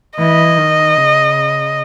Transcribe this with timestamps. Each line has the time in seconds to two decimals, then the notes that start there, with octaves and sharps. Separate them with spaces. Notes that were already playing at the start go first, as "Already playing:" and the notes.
0.18 E3 D#5
0.57 D#3
0.97 C#3